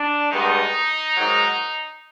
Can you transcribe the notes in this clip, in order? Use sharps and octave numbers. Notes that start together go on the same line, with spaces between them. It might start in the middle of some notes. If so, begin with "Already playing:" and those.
Already playing: D4
G2 D#3 G#3 B3 D#4
G#2 D#3 F#3